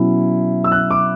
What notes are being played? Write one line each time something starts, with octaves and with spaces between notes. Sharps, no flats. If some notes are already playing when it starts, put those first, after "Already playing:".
Already playing: B2 F#3 C#4 E4
E6
F#6
D6